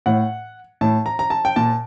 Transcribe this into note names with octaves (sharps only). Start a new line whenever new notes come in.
A2 F#5
A2 A5
A#5
A#5
A5
G5
A#2 A5